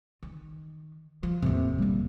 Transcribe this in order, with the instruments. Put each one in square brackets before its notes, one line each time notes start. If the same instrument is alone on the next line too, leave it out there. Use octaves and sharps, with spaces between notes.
[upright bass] D#3
F3
[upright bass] E2 A#3 [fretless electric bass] A2 C3
[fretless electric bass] F1 G3 A#3 [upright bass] B2 D3